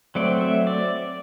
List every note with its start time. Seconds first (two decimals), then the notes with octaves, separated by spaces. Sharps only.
0.15 F#3 A3 C4 D5
0.41 E5
0.67 D5